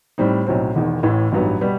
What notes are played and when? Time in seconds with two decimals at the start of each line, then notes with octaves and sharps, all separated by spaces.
0.18 A2 G3 C4 D#4
0.47 B1 A2 F#3 C4
0.75 E1 E2 D#3
1.03 A1 A2 E3
1.32 A1 G2 F#3 B3 D#4
1.61 B2 G3 B3